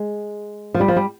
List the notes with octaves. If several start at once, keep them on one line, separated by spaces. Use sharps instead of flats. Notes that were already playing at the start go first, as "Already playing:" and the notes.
Already playing: G#3
F3
G3
F3
G3